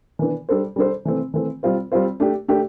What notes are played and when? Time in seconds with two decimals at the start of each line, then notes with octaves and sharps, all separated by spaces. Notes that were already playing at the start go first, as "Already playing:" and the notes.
0.19 E3 B3 D4
0.49 G3 D4 A4 C5
0.76 G3 D4 A4 C5
1.05 E3 A3 C4
1.34 E3 A3 C4
1.63 G3 C4 F4 C5
1.92 G3 C4 F4 C5
2.20 A3 D4 G4
2.48 A3 D4 G4